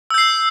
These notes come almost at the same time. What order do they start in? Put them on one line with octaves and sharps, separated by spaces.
E6 G6 C7